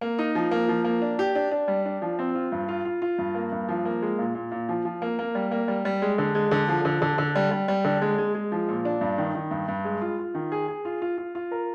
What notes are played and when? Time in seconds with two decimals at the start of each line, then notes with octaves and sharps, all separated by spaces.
0.01 A#3
0.19 D#4
0.35 F3
0.51 A#3
0.69 F3
0.84 A#3
1.02 D4
1.19 G4
1.35 D4
1.51 D4
1.68 G3
1.85 D4
2.02 F3
2.19 C4
2.35 F4
2.52 G2
2.68 F4
2.85 F4
3.02 F4
3.18 G2
3.35 A#3
3.52 G2
3.69 F3
3.85 A#3
4.02 G#3
4.19 A#2
4.35 A#2
4.51 A#2
4.69 F3
4.85 F3
5.02 A#3
5.19 A#3
5.35 G3
5.51 A#3
5.68 G3
5.85 G3
6.02 G#3
6.18 D3
6.35 G#3
6.51 D3
6.68 F3
6.85 D3
7.02 D3
7.18 D3
7.35 G3
7.51 G3
7.68 G3
7.84 D3
8.02 G#3
8.18 G#3
8.35 G#3
8.52 F3
8.68 A#2
8.85 D4
9.01 G2
9.18 D#3
9.35 D#3
9.51 G2
9.68 G2
9.85 G#3
10.01 F4
10.19 F4
10.35 D#3
10.52 G#4
10.68 G#4
10.85 F4
11.02 F4
11.18 F4
11.35 F4
11.51 A#4